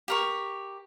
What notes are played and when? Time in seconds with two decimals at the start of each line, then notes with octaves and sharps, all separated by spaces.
0.08 G4 A#4 C#6